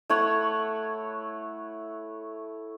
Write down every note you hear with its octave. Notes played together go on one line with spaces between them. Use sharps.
A3 E4 C#5 F#5